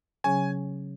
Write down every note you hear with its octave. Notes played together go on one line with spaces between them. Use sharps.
C#3 F#3 C#4 G#4 C#5 G#5